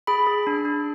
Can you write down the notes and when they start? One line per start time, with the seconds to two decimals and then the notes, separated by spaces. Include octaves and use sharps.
0.07 G#4 B5
0.27 G#4
0.47 D4
0.65 D4